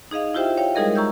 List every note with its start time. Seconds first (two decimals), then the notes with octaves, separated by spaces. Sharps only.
0.11 D#4 G#4 D#5 F5
0.34 E4 F4 G4 C5 E5 G5
0.57 C#5 F5 G5
0.75 G3 G#3 D#4 G#4 A#4 D#5
0.96 A#5 C#6 E6 G6